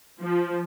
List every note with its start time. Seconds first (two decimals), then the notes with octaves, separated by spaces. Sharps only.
0.21 F3